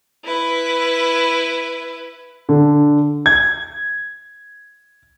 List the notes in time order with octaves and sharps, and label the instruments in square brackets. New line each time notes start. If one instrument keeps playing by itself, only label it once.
[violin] E4 B4
[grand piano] D3
G#6